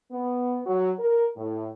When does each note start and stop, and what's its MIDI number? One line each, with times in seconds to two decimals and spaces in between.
0.12 0.60 59
0.66 0.91 54
0.99 1.26 70
1.37 1.68 45